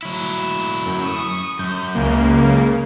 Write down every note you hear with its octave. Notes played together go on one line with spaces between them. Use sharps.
F#3 E4
F#2
C#6 D#6
F#2 G6
C#2 C#3 A#3